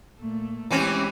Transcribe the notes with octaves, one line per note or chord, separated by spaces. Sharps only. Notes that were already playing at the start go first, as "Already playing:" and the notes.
A#2 A3
E3 G#3 C4 C#4 G4